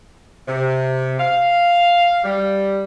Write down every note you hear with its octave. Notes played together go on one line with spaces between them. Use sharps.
C3
F5
G3